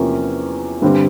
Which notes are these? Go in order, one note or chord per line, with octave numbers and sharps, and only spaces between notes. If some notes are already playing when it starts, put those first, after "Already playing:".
Already playing: E2 C3 F3 A#3 C#4
G2 D3 G3 C4